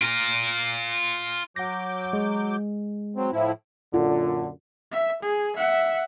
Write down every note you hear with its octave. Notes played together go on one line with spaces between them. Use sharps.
F4 A#4
F#3 F#5 D6 G6 A#6
G#3
F#3 C4
A2 F3 E4
F#2 A#2 D3 F4
E5
G#4
E5 F#5